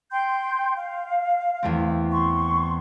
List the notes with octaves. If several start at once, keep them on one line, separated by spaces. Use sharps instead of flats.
G5 C6 G6
F5
E2 A3 C4
C6 C#6